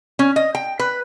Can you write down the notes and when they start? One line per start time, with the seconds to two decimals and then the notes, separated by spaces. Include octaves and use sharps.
0.19 C#4
0.36 D#5
0.55 G5
0.79 B4